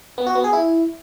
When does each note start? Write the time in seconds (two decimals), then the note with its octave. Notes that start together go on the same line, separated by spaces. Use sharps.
0.18 B3
0.27 F#4
0.35 B3
0.44 G#4
0.53 E4